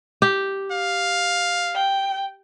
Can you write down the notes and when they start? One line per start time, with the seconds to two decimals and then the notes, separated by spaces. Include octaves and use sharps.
0.22 G4
0.71 F5
1.75 G5